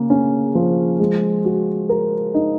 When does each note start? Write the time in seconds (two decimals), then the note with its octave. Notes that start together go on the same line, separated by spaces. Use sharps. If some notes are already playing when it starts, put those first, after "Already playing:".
Already playing: C#3 A#3
0.10 C#4
0.55 F3
0.99 G#3
1.45 F#4
1.89 A#4
2.34 D#4